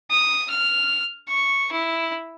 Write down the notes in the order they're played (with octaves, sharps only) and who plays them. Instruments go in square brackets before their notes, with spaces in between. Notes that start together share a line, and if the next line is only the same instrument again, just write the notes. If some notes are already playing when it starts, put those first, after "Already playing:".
[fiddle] D#6
F6
C#6
E4